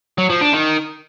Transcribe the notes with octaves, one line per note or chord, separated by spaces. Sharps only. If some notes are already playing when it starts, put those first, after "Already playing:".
F#3
F3
D4
D#3